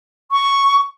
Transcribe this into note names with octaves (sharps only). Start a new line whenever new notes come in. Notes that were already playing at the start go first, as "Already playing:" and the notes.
C#6